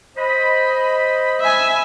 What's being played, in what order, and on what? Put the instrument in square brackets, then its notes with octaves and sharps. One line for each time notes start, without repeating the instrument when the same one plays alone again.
[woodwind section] C5 D#5 B5
[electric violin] E5 G#5